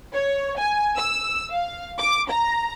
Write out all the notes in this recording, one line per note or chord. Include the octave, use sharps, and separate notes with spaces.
C#5
G#5
E6
F5
D6
A#5